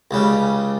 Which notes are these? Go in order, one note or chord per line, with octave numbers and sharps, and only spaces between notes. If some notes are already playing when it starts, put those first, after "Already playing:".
C#2 C#3 G3